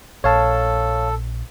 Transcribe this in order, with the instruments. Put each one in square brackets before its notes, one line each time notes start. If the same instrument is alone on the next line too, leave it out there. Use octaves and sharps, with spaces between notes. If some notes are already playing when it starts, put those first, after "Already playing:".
[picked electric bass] A#1 [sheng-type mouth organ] A4 [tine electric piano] C#5 F5 A5